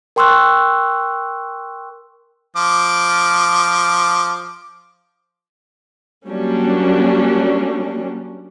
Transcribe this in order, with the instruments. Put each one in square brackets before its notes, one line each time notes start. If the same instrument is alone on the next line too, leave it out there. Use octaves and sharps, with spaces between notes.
[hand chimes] A#4 G5 C6 C#6 E6 F#6
[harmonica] F3 D6
[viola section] F#3 G3 A#3 C#4 D4